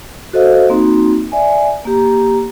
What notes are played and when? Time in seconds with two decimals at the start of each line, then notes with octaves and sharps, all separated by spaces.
0.33 F#4 A4 C5 D#5 F5
0.70 A#3 C4 D#4 F#4
1.32 D5 E5 G#5
1.85 A#3 G4 A#5